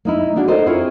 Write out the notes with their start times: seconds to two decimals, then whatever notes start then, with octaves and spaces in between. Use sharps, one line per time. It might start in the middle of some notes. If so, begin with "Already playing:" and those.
0.05 A#3 D#4 E4
0.36 A#3 D4 F#4 G#4
0.48 D#4 A4 A#4 C5 D5 D#5
0.66 C4 E4 F4 G#4 A#4 C#5